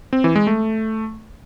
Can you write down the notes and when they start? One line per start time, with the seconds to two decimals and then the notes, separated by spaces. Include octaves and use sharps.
0.13 C4
0.24 E3
0.36 G#3
0.47 A3